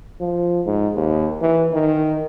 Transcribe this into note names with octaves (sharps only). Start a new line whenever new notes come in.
F3
G#2
D#2
E3
D#3